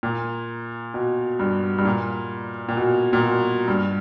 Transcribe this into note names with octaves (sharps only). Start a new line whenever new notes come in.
A#2
B2
G2
G2
A#2
A#2
B2
A#2
B2
G2